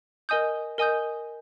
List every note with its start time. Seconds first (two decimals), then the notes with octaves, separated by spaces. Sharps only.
0.29 A#4 D#5 G#5 D#6 G6
0.78 A#4 D#5 G#5 D#6 G6